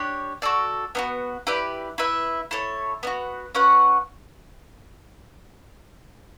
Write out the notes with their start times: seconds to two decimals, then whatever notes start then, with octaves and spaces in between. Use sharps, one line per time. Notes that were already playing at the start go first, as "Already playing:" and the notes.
Already playing: D4 G4 C#5
0.42 F#4 A4 D5
0.95 B3 D4 F#4
1.47 E4 G4 B4 D5
1.98 E4 B4 E5
2.51 E4 A4 C#5
3.03 B3 D4 F#4
3.55 C#4 F#4 B4 F#5